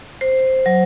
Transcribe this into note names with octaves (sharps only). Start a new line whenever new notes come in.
C5
F#3